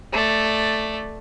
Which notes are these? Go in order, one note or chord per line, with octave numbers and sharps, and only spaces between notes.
A3 D5